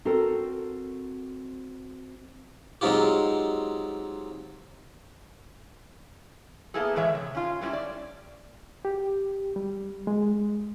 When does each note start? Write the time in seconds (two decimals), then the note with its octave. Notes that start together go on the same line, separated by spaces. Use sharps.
0.05 C4 F#4 A4 A#4
2.81 F#3 G#3 C4 D#4 F4 G4
6.74 A#3 B3 E4 G#4 A4
6.96 A2 E3 G#3 C#5 E5
7.15 C3
7.35 C#4 F4
7.61 F#3 G3 C4 C#4 E4
7.73 D5
8.85 G4
9.56 G3
10.07 G#3